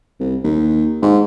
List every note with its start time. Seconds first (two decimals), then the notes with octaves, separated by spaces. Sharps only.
0.20 C2
0.44 D#2
1.02 G#2